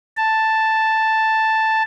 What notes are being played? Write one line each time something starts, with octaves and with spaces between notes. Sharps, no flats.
A5